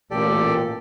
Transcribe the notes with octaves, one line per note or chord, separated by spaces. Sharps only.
A1 A#2 G4 A4 D5